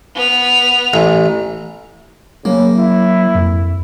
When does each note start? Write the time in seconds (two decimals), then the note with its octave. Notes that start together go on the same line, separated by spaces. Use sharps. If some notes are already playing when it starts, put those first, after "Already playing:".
0.15 B3 F7
0.94 A1
2.45 C#3 F#3 A#3
2.78 E4
3.35 F2